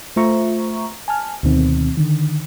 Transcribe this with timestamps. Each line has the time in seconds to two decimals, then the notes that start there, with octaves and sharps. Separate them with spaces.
0.16 A3 F4 C5 E5 A#5 C#6
1.08 G#5 A5 F6
1.43 D2 B2 D#3 C4
1.97 D3 D#3